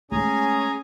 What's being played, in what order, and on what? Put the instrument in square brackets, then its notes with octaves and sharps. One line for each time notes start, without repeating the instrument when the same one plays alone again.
[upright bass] G#3 A3 [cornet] C#4 [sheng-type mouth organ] G#4 G#5 A#5